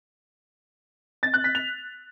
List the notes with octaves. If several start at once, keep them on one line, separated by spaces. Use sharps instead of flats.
A6
F#6
B6
F7